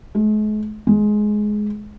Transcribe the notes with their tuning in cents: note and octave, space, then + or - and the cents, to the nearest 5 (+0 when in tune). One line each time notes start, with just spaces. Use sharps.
G#3 +45
G#3 +15